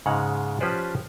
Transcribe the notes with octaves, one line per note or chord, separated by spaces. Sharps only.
G#2 C#3 G#3 F#5 A#5
F3 C#4 G4 B4 C5 D5